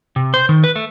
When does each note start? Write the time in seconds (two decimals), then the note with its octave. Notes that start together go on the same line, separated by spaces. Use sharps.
0.16 C3
0.34 C5
0.49 D#3
0.64 B4
0.76 A3